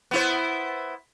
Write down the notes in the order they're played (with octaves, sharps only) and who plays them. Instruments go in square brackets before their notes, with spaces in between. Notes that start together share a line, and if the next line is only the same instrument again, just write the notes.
[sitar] B3 E4 C5